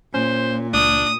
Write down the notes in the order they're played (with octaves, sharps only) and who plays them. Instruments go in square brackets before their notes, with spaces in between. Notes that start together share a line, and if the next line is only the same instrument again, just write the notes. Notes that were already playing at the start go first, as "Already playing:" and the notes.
[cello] A#2 [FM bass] C#4 [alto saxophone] C5
[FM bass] C#2 [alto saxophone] D4 [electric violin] D#6